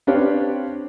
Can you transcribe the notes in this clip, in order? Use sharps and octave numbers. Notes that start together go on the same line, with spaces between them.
C4 D4 G4 B4 C#5 F5